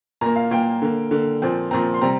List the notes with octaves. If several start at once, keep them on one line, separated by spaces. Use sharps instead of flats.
A#2 A#3 A#5
F5
A#2 A#3 G5
D3 A#3
D3 A#3
A#2 F3 C4
A#2 F3 C4 A#5
C6
C3 G3 C4 A#5